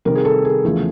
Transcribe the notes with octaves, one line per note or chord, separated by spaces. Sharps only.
C3 D#3 G3 A#4
G#4
A4
G#4
E2 C#3 F3 A3